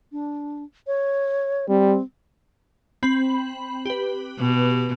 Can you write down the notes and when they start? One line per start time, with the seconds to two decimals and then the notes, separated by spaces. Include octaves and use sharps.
0.12 D4
0.87 C#5
1.69 G3 C4
3.03 C4 B5 F#7
3.86 G4 B4
4.39 B2